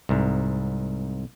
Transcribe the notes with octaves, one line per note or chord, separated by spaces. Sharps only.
C2 G#2